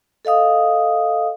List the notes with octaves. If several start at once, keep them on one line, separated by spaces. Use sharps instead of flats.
A4 D#5 F5 D#6